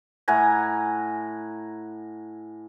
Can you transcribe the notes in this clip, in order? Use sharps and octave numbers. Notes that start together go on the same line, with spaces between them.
A2 F#5 G#5 A#5